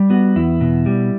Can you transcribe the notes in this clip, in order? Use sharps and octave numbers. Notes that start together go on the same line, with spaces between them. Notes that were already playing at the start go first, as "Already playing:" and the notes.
Already playing: G3
B3 F#4
E2 E4
B2
G3